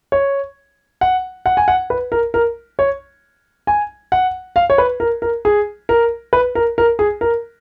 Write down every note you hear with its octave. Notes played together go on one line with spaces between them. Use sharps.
C#5
F#5
F#5
G#5
F#5
B4
A#4
A#4
C#5
G#5
F#5
F5
C#5
B4
A#4
A#4
G#4
A#4
B4
A#4
A#4
G#4
A#4